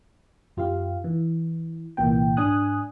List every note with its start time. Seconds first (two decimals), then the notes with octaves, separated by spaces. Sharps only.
0.57 F#2 F4 G4 F5
1.04 E3
1.97 C2 A#2 E3 A#3 G5
2.37 G#2 D4 G#5 D#6 F#6